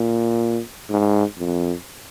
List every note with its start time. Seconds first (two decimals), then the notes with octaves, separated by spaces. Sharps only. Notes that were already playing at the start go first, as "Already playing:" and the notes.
Already playing: A#2
0.90 G#2
1.39 F2